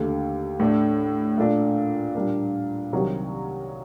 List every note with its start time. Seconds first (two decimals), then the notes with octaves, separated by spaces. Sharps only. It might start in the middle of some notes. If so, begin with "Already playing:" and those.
Already playing: D#2 D3 A3
0.60 A2 A3 D4
1.38 A#2 A3 D4
2.15 A#2 G3 A#3 D4
2.93 C2 C3 D#3 F#3